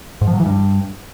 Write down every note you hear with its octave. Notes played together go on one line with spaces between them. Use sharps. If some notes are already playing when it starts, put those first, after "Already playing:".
G#2
F3
F#3
E3
G2